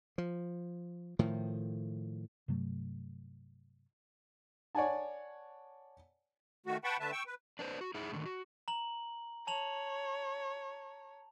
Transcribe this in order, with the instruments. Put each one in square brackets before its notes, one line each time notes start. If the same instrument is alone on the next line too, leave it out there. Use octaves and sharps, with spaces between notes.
[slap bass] F3
A2 D#3 F3
[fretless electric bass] G2 C3 F#3 A3
[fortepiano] C#5 D5 F#5 G#5 A5
[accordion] D#3 A3 F#4
B4 F#5 G5 A5 B5 C#6
D3 A3 B4 E5 A5
G5 C#6 E6
B4
[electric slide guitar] D4 B4 C5
F#4
D#4 E4 G#4
A2 D3 D#3
F#4
[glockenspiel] A#5 F#7
[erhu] C#5 [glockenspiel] A5 F7 F#7